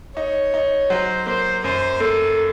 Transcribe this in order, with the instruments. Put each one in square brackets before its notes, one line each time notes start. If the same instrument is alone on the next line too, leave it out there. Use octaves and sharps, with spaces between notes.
[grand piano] D#4 [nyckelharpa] C#5
[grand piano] D#4
[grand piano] F#3 [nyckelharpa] C5
[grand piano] A#3 [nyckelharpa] C5
[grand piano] F#2 [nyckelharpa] C5
[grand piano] A#3 [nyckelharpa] A4